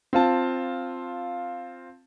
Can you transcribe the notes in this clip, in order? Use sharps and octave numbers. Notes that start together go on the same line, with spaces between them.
C4 F4 A5